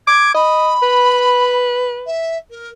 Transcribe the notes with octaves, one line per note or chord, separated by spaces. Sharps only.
D6 G#6
D#5 B5
B4
E5
A#4